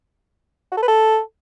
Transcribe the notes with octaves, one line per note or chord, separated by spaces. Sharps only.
F#4
A4
B4
A4